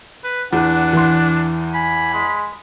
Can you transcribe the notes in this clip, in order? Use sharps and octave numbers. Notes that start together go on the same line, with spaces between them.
B4
E2 D4 F#5
E3 C6
G#5 B5
G#3